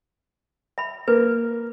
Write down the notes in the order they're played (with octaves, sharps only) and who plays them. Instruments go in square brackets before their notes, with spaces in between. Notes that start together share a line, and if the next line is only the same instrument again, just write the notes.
[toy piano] E5 B5
[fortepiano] A#3 [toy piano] B4